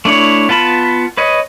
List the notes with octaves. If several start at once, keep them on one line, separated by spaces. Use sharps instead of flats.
A3 D4 E4 C#5
B3 F4 A5 B5
B4 C#5 D#5